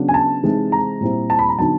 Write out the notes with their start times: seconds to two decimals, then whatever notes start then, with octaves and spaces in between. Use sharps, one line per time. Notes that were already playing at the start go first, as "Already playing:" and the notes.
Already playing: C#3 F#3 B3 D4
0.09 G#5
0.14 A5
0.43 C3 E3 G#3 C4 D#4
0.72 A#5
1.01 A#2 G3 C4 E4
1.30 A5
1.39 B5
1.49 A#5
1.58 D3 F#3 B3 D#4 A5